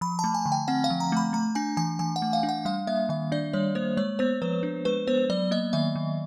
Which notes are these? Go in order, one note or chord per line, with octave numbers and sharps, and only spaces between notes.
F3 B5
A5
A3
G#5
D3
G5
C4 F#5
F5
F3
A#5
A3 B5
A3 A#5
D4 G#5
E3 G#5
E3 G#5
F#5
A3
F5
D4
F#5
G3 F5
A#3 E5
D#3 E5
D4 D5
G3 C#5
A#3 C5
G#3 C#5
B3 C5
F3 B4
D4
G#3 B4
B3 C5
F#3 D5
A#3 D#5
D#3 E5
D#3